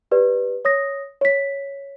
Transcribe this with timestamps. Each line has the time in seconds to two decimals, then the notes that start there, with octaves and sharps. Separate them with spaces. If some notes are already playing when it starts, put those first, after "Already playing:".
0.11 G4 B4 D5
0.65 C#5 D#6 A#6
1.21 C#5 B6